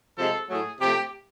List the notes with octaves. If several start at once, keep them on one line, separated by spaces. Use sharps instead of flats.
C3 F3 G#3 A4
A2 F#3 A3 G#4
C3 F3 A3 G4